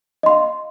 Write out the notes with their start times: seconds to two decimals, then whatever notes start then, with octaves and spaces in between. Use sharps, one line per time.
0.23 D#5
0.26 C6
0.29 F5